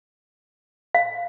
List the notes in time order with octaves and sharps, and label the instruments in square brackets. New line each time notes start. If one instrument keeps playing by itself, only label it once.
[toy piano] F5